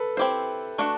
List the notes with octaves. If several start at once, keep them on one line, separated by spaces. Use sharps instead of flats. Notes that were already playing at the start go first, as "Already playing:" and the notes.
Already playing: A4 B4
C4 E4 G4 C5
A3 D4 F#4